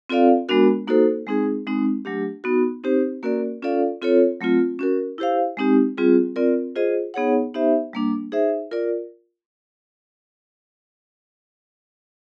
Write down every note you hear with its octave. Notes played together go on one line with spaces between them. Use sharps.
C4 F4 A4 D5 F5
G#3 B3 D4 F#4 A#4
A#3 D#4 F#4 A4 C5
G#3 C4 D#4 G#4
G#3 C4 D#4
F#3 A3 D4 G4
B3 D#4 F#4
C4 D#4 G4 C5
A#3 C#4 F#4 A#4 D5
C#4 F4 A4 D5 F5
C4 F4 A4 C#5
F#3 A3 C4 F4
C#4 F#4 A#4
E4 G4 C5 F5
G#3 C4 D#4 G4
G3 C4 F4 G#4
C4 F4 A#4 D5
F4 G#4 C5 D#5
B3 D#4 G#4 C#5 F#5
B3 D#4 G4 C5 E5
G3 A#3 D4
D#4 G#4 C5 E5
F4 A#4 D5